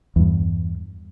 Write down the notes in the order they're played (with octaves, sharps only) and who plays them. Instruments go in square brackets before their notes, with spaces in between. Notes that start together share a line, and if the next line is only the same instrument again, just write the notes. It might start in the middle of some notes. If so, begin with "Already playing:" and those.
[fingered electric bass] E2 G2